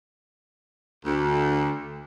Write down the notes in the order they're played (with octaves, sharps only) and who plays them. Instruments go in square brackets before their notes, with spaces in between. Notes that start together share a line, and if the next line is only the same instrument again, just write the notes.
[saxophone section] D2